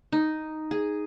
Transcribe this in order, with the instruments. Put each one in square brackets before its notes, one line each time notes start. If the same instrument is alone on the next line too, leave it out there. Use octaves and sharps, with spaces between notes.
[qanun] D#4
G#4